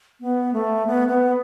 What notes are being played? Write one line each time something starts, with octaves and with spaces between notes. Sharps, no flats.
B3
A3
B3
B3